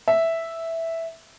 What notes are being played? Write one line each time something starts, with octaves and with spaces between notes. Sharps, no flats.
E5